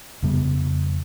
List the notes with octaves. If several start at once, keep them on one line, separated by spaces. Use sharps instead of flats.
F2 C#3 G3 B3